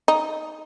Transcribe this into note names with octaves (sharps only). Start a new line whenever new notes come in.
D#4